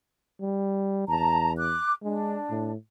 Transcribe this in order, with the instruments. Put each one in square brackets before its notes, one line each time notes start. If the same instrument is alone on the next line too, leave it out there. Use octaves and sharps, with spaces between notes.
[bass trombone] G3
[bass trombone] E2 [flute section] A5 A#5
[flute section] D6 F#6
[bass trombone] G#3 [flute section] D4
[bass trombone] A2